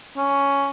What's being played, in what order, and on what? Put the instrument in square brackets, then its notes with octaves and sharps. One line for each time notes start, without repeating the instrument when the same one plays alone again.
[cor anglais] C#4